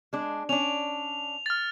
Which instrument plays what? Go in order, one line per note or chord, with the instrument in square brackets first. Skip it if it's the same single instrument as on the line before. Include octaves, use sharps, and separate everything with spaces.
[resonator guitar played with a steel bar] G#3 D4
[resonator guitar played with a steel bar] C#4 D4 [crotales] F7
[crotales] F6 A6